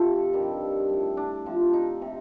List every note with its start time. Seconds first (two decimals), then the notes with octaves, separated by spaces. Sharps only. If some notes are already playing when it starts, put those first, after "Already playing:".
Already playing: C3 F3 A4
0.33 G2 D#3 G3
0.89 A2 G3
1.17 D4
1.46 C3 F3
1.73 D#4
2.02 C3